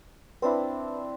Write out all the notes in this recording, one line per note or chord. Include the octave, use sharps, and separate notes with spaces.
C4 D4 E4 B4